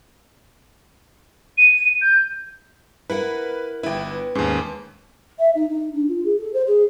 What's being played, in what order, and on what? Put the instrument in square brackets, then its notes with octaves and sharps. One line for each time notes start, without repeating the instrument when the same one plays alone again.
[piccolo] D#7
G6
[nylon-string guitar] E4 A#4 F#5 [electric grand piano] B4
[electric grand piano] G1 E4 [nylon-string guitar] B4 G5
[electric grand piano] D#2 G#2 [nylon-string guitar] C#4
[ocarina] E5
D#4
D#4
D4
F4
G#4
A4
C5
G#4